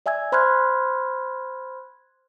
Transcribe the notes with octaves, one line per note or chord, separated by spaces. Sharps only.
D5 E5 G#5 E6 G#6
C5 B5 C6 F6 F#6 G#6